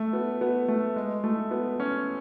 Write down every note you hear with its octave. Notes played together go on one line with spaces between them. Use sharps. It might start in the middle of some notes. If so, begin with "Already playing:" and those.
Already playing: A3
B3
B3
A3
G#3
A3
B3
C#4